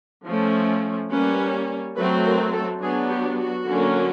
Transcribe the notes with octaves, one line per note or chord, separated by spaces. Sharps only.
F3 A3 C#4
G3 A#3 C#4 B4
F#3 A3 C4 B4
A#4
A4
F#3 B3 D4 G#4
G4
F#4
D3 F#3 A#3 C#4